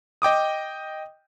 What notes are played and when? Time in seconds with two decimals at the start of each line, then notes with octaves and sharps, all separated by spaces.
0.22 D#5 G5 D6 D#6